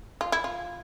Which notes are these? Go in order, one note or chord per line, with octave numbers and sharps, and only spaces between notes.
F4
E4
F4